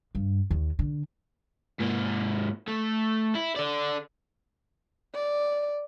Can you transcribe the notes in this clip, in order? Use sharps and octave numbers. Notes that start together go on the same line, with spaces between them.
G2
D#2
D3
G#2 A#3
A3
E4
A4 D5
D5